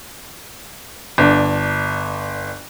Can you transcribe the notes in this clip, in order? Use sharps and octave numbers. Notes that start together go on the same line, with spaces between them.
G1 D4